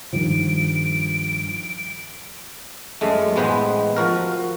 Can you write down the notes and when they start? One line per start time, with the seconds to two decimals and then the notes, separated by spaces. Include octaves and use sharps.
0.13 G2 D#3 F3 D7
3.01 F#2 G#3 A3
3.36 A1 G#3 B3 B4 C5
3.97 F3 F#4 A#4